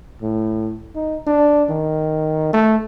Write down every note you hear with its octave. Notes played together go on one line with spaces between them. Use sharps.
A2
D#4
D4
D#3
A3